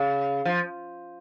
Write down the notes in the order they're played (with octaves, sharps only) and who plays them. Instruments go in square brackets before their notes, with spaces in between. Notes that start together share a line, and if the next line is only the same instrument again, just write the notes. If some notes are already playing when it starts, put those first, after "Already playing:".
Already playing: [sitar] C#3
F3